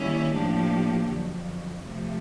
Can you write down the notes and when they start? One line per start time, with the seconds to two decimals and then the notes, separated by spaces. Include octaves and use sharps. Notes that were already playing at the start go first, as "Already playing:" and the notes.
Already playing: D#3 G3 A#3 C#4 E4
0.31 A2 F3 A#3 D4 G4
1.07 F2 D3 F#3
1.83 C3 F3 A3